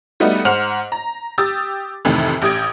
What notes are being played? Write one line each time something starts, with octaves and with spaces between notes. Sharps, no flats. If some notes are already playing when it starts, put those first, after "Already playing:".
G3 A3 B3 D#4 F#4
G#2 C5 F#5 F6 F7
A#5
G4 D#6 E6 A6
F2 A2 C3 D#3 E3
A1 G4 D#6 G#6 D7